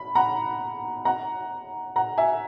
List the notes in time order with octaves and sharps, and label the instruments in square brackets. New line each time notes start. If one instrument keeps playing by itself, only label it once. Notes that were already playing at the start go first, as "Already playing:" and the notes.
Already playing: [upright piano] B5
F#5 A#5
F#5 A#5
F#5 A#5
E5 G#5